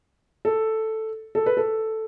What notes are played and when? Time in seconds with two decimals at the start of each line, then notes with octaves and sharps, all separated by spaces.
0.45 A4
1.35 A4
1.46 B4
1.57 A4